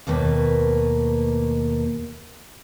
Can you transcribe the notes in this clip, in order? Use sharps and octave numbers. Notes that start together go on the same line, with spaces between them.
D#2 B2 A3 A#3 B4